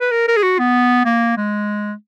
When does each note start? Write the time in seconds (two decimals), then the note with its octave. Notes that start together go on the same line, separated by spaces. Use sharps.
0.01 B4
0.11 A#4
0.28 A#4
0.37 G#4
0.43 F#4
0.59 B3
1.05 A#3
1.37 G#3